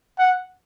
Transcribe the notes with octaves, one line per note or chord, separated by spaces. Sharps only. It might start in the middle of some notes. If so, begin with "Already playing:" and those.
F#5